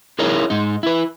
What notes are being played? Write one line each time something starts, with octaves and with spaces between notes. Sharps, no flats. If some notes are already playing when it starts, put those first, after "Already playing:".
D#4 E4 G#4 A#4 C#5 D#5
G#2 D#4
E4 B4